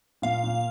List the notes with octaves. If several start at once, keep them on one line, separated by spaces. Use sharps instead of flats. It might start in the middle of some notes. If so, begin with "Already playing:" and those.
A#2 F5
A#2